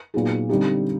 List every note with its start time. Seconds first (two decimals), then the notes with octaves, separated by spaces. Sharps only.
0.14 A#2 F#3 B3 D#4 G#4
0.49 D3 G3 C4 D#4 G4